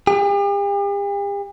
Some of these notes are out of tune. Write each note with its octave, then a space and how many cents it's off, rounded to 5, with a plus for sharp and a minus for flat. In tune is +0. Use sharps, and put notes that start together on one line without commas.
G4 +45